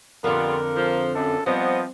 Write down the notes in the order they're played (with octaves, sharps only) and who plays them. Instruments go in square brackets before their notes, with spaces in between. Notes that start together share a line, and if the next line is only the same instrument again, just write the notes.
[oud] F2 D3 [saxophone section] G3 B3 F4 [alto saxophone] A#4
[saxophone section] F3
[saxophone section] F#2 [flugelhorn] A4
[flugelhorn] F3 [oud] G3 [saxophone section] B3 D#5 [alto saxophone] C4